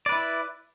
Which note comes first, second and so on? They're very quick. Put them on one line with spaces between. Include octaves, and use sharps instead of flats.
D5 B4 E4